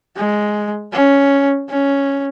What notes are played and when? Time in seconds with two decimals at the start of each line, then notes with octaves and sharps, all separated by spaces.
0.17 G#3
0.93 C#4
1.69 C#4